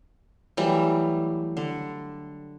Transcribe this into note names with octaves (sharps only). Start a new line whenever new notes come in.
E3 F#3 G3 A3
D3